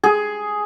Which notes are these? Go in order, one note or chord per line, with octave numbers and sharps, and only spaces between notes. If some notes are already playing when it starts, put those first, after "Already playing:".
G#4